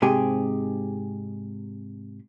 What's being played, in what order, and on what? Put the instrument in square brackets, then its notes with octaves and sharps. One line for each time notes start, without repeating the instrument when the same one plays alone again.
[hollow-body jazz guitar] G#2 C3 G4 G#4